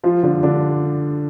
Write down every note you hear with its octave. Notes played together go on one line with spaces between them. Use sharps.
F3 F4
D3 D4
D3 D4